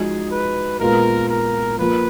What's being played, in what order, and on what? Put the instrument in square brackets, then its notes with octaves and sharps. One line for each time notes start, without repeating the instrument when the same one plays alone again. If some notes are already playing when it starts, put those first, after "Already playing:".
Already playing: [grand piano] F3 G#3 D#4 F#4 [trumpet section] G#4
[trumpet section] B4
[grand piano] A#2 G#3 B3 F4 [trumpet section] A#4
[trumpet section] A#4
[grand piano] F3 A#3 F4 [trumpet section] B4